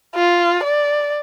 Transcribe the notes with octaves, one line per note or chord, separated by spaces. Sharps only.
F4
D5